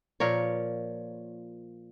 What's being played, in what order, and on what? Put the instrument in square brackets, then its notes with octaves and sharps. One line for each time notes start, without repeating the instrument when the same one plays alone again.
[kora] A#2 F3 A#4 C#5